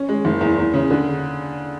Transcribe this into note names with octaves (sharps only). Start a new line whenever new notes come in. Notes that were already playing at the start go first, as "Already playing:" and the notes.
Already playing: C#4
G#3
F#1
E2
E2
C#3
D3